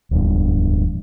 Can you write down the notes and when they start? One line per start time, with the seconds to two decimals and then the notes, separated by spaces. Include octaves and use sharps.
0.11 D1 A#1 E2 G2